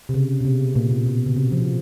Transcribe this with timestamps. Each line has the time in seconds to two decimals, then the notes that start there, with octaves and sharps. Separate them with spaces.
0.09 C3
0.14 C#3
0.40 B2
0.45 C3
0.75 A#2
0.91 B2
1.06 B2
1.26 C#3
1.36 C3
1.52 F3